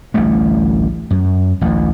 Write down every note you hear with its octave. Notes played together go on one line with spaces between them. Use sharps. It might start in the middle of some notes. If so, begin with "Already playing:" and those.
A1 D2 G3 A3
F#2
A1 D2